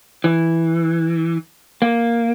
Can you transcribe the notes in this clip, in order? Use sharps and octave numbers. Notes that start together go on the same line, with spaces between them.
E3
A#3